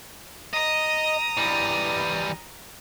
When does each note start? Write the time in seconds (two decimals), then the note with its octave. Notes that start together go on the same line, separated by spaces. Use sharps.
0.54 D#5 A#5 D#6
1.37 E3 G3